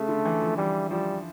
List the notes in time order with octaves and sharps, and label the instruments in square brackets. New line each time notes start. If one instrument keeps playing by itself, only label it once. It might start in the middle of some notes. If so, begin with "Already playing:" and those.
Already playing: [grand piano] C#3 [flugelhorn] A3
[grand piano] D3
E3
F3
[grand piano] E3 [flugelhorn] G3
[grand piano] F3 [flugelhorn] G3